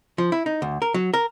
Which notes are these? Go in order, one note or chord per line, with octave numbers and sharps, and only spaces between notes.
F3
E4
D#4
D2
A#4
F#3
A#4